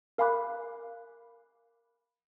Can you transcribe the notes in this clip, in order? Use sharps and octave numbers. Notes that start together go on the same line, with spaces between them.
A#4 F5 G#5 B5 D6 F#6